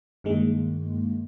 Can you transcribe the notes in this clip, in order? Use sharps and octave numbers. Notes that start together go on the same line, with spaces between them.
G2 D#3 G#3 A#3